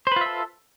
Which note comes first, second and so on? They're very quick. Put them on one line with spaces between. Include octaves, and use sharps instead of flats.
C5 B4 F4 E5 A4